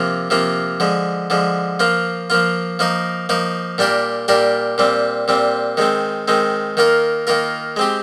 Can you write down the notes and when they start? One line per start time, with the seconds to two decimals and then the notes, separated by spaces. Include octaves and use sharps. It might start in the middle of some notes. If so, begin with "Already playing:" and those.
Already playing: C3 F3 A#3 F4
0.30 C3 F3 A#3 F4
0.80 D3 F3 G#3
1.30 D3 F3 G#3
1.80 F3 A#3 F4
2.30 F3 A#3 F4
2.79 F3 A#3 D#4 A#4
3.29 F3 A#3 D#4 A#4
3.78 A#2 G3 D4 G4 A#4
4.28 A#2 G3 D4 G4 A#4
4.78 A#2 G3 C4
5.28 A#2 G3 C4
5.77 D#3 G#3 C4
6.28 D#3 G#3 C4
6.77 D#3 A#3 F4 A#4
7.27 D#3 A#3 F4 A#4
7.76 G#3 C4 G4